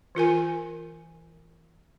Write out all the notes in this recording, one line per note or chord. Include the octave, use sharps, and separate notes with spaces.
E3 F4 A#4 G#5